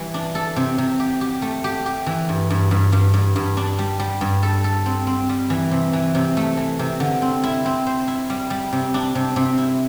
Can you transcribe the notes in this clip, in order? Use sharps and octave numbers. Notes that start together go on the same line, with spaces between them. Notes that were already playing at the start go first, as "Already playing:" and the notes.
Already playing: E3 G3
D4
A4
C3
C3
G4
G4
A3
G4
G4
E3
G2
G2
G2
G2
G2
G2
D4
G3
G3
G2
A4
A4
C4
C4
G3
E3
C3
E3
C3
A3
E3
C3
D3
C4
E4
C4
C5
E4
G3
G3
C3
D4
C3
C3
E4